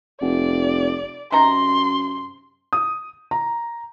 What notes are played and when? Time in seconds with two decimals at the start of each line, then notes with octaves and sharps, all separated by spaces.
0.22 F1 D5
1.32 F#2 C3 D#4 A#5 C6
2.73 D#6
3.31 A#5